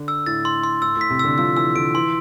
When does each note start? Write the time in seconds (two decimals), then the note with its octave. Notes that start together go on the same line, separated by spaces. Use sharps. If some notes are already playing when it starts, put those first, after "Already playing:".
Already playing: D3
0.08 E6
0.26 A2 A6
0.45 C6
0.64 C6
0.82 A2 E6
0.97 A2 B6
1.10 C3
1.19 D3 E6
1.38 F3 E6
1.57 E3 E6
1.75 D3 D7
1.94 E3 C6